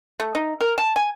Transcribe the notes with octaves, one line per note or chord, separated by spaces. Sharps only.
A3
D#4
A#4
A5
G#5